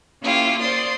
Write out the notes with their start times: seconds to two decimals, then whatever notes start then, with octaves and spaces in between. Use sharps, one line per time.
0.24 A#3 C#4 E4 F4 G4
0.59 C5 D5 C6 D#6